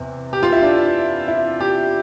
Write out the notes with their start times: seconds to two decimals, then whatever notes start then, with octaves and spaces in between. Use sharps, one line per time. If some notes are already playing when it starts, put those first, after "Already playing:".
Already playing: E2 C3 E3
0.33 G4
0.43 F4
0.52 E4
0.62 D4
1.28 E4
1.60 G4